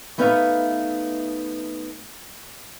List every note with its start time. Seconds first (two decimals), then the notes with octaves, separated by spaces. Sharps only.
0.18 A3 B3 D#4 B4 E5 F5